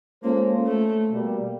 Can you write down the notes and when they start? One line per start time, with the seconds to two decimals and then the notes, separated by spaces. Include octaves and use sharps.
0.23 G#3 A#3 C#4 F4 A4 C5
0.66 A3
1.10 B2 G3 A#3